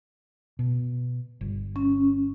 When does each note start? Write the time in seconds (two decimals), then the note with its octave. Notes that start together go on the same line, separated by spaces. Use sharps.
0.59 B2
1.41 G1
1.76 C#4